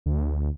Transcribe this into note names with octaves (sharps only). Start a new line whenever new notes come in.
D2